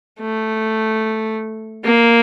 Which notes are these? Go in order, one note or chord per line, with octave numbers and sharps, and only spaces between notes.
A3
A#3